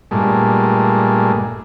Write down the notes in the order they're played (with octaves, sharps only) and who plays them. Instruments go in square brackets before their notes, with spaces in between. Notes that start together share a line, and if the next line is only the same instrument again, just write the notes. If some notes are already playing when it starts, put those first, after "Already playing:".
[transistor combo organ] G2 A#2 G#3 A3